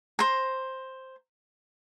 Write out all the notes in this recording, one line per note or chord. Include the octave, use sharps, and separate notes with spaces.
C5 A#5